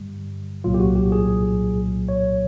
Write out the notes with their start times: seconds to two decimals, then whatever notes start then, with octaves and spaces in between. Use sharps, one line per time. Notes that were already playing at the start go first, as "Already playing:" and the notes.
Already playing: G2 D3 G3
0.64 C2 A#2 F#3 F4
0.74 G4
0.80 F#4
0.95 G4
1.12 G#4
2.09 C#5